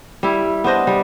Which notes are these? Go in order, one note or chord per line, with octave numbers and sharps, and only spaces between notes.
G3 E4
B3 D4 C5 D#5
G3